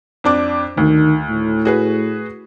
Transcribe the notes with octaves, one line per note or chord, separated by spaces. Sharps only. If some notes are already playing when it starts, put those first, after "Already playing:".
F2 D4 D6
D2 D#3
A2
F#4 G#4 B4